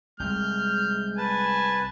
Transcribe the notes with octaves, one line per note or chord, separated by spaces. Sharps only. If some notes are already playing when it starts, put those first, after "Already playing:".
C2 G#3 F6 G6
B4 G#5 A5